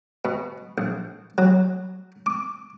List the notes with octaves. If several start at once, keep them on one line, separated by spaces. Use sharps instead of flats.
B2
A#1
F#3
D6